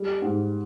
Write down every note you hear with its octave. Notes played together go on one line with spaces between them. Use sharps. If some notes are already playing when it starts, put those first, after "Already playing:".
Already playing: G3
G#2